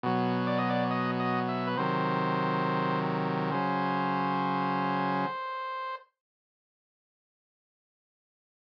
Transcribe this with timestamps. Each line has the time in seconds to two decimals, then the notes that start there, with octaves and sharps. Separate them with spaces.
0.03 B2 F#3
0.47 D5
0.58 D#5
0.69 D5
0.91 D#5
1.20 D#5
1.48 E5
1.67 B4
1.77 C3 D#3 F#3 C5
3.52 C#3 F#3 C5